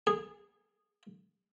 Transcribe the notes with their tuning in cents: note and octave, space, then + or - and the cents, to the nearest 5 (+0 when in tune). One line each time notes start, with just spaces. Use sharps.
G#4 -15